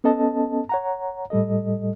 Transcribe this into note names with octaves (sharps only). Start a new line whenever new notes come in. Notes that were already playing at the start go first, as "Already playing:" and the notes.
B3 C#4 A4 D#5 A5
C#5 F#5 A#5
A2 G3 A4 D#5